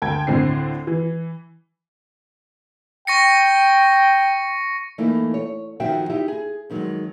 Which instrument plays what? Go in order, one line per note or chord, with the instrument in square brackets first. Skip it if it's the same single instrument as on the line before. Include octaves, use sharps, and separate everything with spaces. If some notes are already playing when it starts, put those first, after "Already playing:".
[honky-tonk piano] D2 G5 A5 G#6
D2 A2 D3 C4 C7
E3
[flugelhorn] G5 [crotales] C#6 A#6 C#7
[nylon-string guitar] E3 A3 A#3 D#4 E4
C#5
F2 D#3 F3 F#4 E5 G5
D#4 E4 G4 E5
G#4
F2 D#3 F#3 G#3